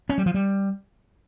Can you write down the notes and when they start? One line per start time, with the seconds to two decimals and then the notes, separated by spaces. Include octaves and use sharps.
0.09 C#4
0.18 G3
0.26 F3
0.34 G3